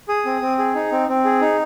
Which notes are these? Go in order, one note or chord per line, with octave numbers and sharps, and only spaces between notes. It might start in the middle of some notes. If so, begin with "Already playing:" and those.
G#4 D#6
C4
C4
G#4
D#4
C4
C4
G#4
D#4